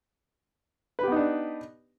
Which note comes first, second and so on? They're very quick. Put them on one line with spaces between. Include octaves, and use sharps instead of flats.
B4 G4 B3 D#4 D4